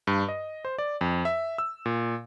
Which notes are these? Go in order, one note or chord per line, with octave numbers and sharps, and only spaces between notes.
G2
D#5
C5
D5
F2
E5
E6
A#2